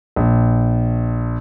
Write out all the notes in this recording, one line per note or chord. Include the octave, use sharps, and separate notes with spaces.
A#1